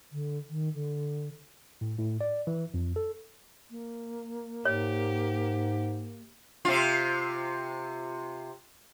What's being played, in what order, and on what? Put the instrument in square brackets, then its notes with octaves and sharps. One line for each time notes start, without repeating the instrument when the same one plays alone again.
[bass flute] D3
D#3
D3
[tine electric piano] A2
A2
D5
E3
F2
A4
[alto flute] A#3
[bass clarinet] G#2 [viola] G4 [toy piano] C#5
[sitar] C3 F4